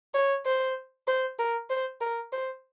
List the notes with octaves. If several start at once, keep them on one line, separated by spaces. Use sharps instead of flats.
C#5
C5
C5
A#4
C5
A#4
C5